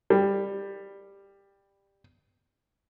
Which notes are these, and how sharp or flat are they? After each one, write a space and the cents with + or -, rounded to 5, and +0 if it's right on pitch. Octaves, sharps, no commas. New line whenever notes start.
G3 +15